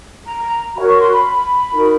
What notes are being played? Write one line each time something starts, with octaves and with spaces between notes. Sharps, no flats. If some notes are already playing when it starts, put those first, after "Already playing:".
A#5
F#4 A#4 C#5 B5
C#6
C6
B5
D#4 F#4 A#4